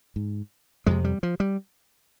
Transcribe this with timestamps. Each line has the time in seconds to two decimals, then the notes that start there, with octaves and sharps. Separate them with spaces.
0.16 G#2
0.86 F2 C3 G#3
1.04 G3
1.23 F3
1.40 G3